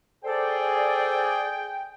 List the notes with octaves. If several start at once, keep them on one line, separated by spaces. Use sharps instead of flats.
G#4 A4 C5 D5 G5